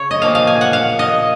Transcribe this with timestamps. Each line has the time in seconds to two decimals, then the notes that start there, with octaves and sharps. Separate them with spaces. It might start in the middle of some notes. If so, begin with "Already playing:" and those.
Already playing: C#3 C#5
0.11 D#5
0.22 A#2 F3 A#3 F5
0.35 F5
0.47 G#5
0.61 F#5
0.73 F5
0.99 D#5